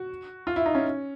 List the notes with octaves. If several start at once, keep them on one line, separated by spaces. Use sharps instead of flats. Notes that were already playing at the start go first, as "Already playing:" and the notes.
Already playing: F#4
F4
E4
D#4
C#4